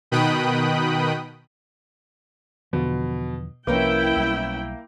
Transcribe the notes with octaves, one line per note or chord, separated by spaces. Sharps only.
B2 D#3 G5 B5 D#6 F#6
E2 B2 D3 F3
C2 F3 A#3 C#4 E4 A#4 B4 G5
B1 G3